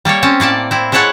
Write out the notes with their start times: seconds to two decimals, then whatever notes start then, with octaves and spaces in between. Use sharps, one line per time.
0.05 G3 A#3 A4 C#5
0.23 C4 C#4 A5
0.40 A2 A#3 D5 A5
0.71 C4 E4
0.92 G#3 E4 A4 C#5 F#5 A5